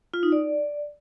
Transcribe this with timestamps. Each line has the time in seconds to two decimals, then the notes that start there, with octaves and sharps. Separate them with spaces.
0.14 F4
0.23 D#4
0.32 D5